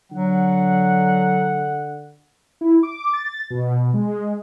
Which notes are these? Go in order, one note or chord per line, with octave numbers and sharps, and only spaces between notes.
D3 F#3 F#5
E4
D6
A6
B2
G#3